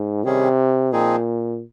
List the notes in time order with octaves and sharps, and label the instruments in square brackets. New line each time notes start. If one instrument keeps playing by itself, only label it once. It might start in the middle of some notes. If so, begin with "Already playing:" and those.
Already playing: [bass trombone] G#2
[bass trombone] C3 [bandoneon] D#3 G3 C#4 G#4
[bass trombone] A#2 [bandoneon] F3 C4 D#4 G#4